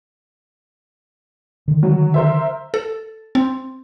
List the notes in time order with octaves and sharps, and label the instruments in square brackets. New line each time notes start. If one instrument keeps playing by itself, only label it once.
[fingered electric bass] D3 D#3
[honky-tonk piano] F#3
A#4 C5 E5
[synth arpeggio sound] A4
C4